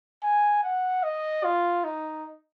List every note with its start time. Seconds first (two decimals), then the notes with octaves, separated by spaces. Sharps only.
0.23 G#5
0.63 F#5
1.03 D#5
1.44 F4
1.84 D#4